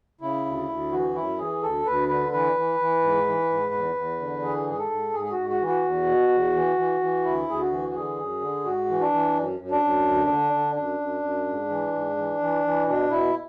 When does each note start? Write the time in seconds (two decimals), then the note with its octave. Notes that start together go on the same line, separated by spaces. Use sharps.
0.21 C#3 E4
0.45 D2
0.68 D2
0.92 E3 F#4
1.15 F#2 E4
1.39 E3 G#4
1.62 D2 A4
1.86 D2 B4
2.08 D3 B4
2.32 E3 B4
2.56 E3
2.80 E3
3.02 G#2
3.26 E3
3.50 G#2
3.73 E2
3.96 E2
4.19 D3
4.43 E3 G#4
4.67 G#2 G#4
4.78 A4
4.91 G#2
5.14 G#2 G#4
5.24 G#4
5.31 G#2 F#4
5.49 F#4
5.61 E3
5.67 F#4
5.84 E2
6.08 B2
6.31 E2
6.55 E3
6.77 E3
7.01 E3
7.24 D2 E4
7.48 D2 G#4
7.60 F#4
7.71 E3
7.89 F#4
7.94 D3 G#4
8.19 F#2
8.41 D3
8.65 G#2 F#4
8.89 E3
9.01 D4
9.12 E3
9.35 F#2
9.59 F#2
9.71 D4
9.82 F#2
10.06 D2
10.29 D3
10.53 D3
10.75 F#2 D4
11.00 F#2
11.22 F#2
11.47 G#2
11.69 E3
11.93 G#2
12.17 E3
12.40 E3
12.64 E3
12.86 B2 D4
13.10 B2 E4